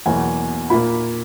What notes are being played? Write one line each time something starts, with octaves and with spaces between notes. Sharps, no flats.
E2 B2 F#3 A#3 G#5
A#2 A#3 B5